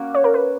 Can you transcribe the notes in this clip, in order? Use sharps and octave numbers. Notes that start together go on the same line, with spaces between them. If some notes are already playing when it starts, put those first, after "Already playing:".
Already playing: A#3 C#4 F#4
C#5
A#4
B4